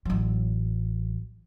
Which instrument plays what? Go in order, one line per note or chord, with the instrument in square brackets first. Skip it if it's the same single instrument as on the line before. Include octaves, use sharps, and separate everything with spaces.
[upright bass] A1 F#3